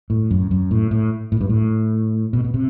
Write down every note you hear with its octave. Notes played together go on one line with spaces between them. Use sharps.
A2
F#2
F#2
A2
A2
A2
G2
A2
B2
B2
C3